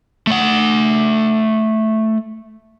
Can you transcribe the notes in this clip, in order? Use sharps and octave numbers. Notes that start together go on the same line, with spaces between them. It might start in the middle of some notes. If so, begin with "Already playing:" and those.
A3 F#5